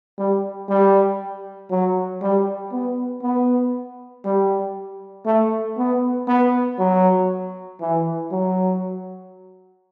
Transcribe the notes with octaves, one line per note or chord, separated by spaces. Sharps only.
G3
G3
F#3
G3
B3
B3
G3
A3
B3
B3
F#3
E3
F#3